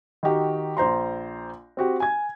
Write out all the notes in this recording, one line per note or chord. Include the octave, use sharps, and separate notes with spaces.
D#3 D#4 F#4 G4
A#1 C5 A#5 C6
C4 F#4 G4
G#5 G#6